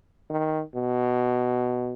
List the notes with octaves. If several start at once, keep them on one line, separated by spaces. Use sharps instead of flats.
D#3
B2